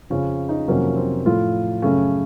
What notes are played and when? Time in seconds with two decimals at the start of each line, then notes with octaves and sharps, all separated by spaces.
0.10 F2 C#3 F3 C#4
0.49 D#4
0.68 F2 C3 D#3 F#3 A#3 C#4
0.96 C4
1.26 A2 F3 A3 F4
1.82 F#2 C#3 A3 C#4